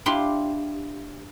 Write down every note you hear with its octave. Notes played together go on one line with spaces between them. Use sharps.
D4 E4 F4 G4 C6